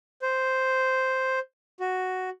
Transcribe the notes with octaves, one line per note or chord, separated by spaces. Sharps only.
C5
F#4